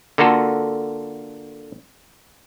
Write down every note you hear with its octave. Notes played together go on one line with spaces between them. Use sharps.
D3 A#3 F4 F#4 A4